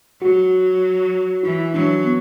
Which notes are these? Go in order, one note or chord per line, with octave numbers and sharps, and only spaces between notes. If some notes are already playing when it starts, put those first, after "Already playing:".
F#3 F#4
E3 E4
F#3 D4
B3